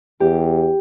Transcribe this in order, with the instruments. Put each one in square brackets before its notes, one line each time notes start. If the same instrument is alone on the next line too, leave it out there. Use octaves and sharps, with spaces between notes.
[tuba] E2 [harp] G4